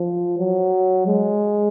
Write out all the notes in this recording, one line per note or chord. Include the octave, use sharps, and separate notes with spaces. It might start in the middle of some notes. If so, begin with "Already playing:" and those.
Already playing: F3
F#3
G#3